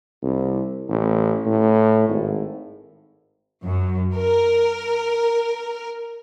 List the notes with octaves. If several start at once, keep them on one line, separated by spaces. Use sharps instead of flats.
C2
A1
A2
G#1
F#2
A#4